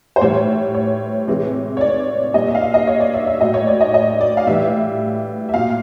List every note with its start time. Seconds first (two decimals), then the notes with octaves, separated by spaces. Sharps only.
0.16 C5
0.21 A2 E3 G3 C#5
0.75 C#5
1.28 C3 E3 G#3
1.77 C#5
1.81 D5
2.34 A#2 G3 D#5
2.47 E5
2.55 F5
2.61 E5
2.74 D#5
2.87 C#5
3.00 D5
3.14 E5
3.27 E5
3.41 A2 F#3 D#5
3.54 C#5
3.67 D5
3.81 D#5
3.94 D#5
4.21 D5
4.37 F5
4.47 A2 E3 G3 E5
5.49 E5
5.54 A#2 F#3 F5